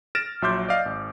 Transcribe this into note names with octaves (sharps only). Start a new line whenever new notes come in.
F6 A6 A#6 D7 E7
A#1 F#3 E5 C6 D6 G6
D5 D#5 F5
G#1